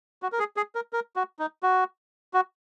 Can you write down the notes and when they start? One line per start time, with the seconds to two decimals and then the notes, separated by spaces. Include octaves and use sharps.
0.22 F#4
0.32 A#4
0.39 G#4
0.57 G#4
0.75 A#4
0.93 A#4
1.16 F#4
1.39 D#4
1.63 F#4
2.34 F#4